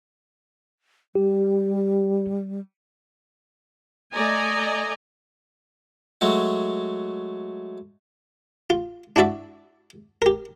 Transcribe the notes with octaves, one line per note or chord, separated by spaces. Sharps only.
G3 G4
A3 D5 D#5 G#5 A#5
F#3 G#3 A3 F#4
F4
D4 E4 F#4 D5 E5
G4 A#4